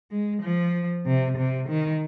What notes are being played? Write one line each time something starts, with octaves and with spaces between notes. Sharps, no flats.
G#3
F3
C3
C3
D#3